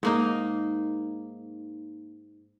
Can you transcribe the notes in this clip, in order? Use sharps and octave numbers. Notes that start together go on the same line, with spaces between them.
G#2 A#3 D#4